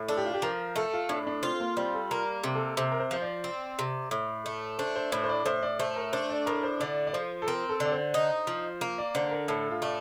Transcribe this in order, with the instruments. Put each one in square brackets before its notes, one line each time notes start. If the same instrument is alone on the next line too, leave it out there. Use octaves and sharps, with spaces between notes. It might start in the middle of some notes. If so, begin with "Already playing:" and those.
Already playing: [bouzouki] A2
[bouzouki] D4 [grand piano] A4
[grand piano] G4
F4
G4
[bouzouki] F3 [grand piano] A#4
[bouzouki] A3 [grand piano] A4
[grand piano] F4
[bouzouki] A2 [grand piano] D4
[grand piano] D4
[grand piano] C4 [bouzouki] F4
[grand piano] A#3
[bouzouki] G3 [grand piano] C4
[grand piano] A4
[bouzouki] A#3 [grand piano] A#4
[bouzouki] C3
[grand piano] A4
[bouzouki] C3 [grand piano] C5
[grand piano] A#4
C5
[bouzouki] F3 [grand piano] C5
[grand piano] D5
[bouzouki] C4
C3
A2
A3
[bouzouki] D4 [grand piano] C5
[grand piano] C5
[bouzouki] A2 [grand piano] C5
[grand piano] C5
D5
[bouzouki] A2 [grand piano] C5
[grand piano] D5
[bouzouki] A3 [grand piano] C5
[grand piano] A#4
[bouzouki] D4 [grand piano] C5
[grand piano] D5
[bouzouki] A2 [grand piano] A#4
[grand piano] C5
[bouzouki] D3 [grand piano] D5
[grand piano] D5
[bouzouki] F3 [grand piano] C5
[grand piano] A4
[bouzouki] C4 [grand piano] A#4
[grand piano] A4
[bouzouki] D3
[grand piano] D5
C5
[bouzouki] D#4
F3
A#3
[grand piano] D5
[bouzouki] D3 [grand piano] C5
[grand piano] A#4
[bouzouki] A2 [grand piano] A4
[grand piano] F4
[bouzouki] A3 [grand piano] D5